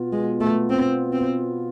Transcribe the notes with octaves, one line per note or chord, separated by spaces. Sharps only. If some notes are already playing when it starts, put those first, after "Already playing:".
Already playing: B2 B3 F4
G#3
A3
C4
C4